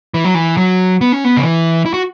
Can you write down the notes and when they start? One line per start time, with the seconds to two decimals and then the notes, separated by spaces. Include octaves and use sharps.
0.14 E3
0.24 F#3
0.34 E3
0.57 F#3
1.01 B3
1.12 C#4
1.24 B3
1.37 C#3
1.43 E3
1.86 E4
1.94 F#4